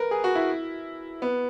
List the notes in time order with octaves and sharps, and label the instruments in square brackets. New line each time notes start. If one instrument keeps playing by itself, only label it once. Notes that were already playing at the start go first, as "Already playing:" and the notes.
Already playing: [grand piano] A#4 B4
G#4
F#4
E4
B3